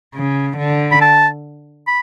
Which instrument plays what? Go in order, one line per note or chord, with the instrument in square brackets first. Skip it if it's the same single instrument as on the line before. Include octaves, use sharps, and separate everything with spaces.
[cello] C#3
D3
[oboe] B5
A5
B5